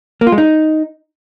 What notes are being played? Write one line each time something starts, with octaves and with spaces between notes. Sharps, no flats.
A#3
F4
G#3
D#4